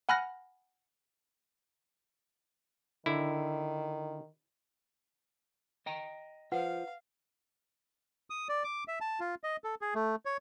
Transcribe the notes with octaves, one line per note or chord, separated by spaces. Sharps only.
F#5 G#5 B5 F6 F#6 A#6
D3 D#3 E4
D#5 G5 A#5
F4 B4 C5 F5 F#5
D#6
D5
D6
E5
A5
F4
D#5
A4
G#4
A3
C#5